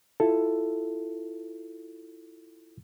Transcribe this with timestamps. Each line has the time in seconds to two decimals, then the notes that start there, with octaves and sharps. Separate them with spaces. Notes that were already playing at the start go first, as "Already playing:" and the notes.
0.20 E4 F4 A4